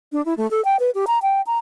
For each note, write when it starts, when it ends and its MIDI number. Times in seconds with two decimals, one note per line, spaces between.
0.12 0.24 62
0.26 0.34 64
0.37 0.49 57
0.51 0.64 69
0.65 0.77 79
0.80 0.90 71
0.95 1.05 67
1.07 1.19 82
1.22 1.41 79
1.47 1.58 82